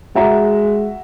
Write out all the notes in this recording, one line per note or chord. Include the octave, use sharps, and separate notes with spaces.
G#3 F#4 E5 A#5